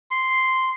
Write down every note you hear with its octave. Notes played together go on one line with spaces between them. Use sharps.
C6